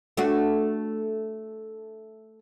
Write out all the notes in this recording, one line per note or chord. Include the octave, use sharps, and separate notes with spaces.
A3 D4 F#4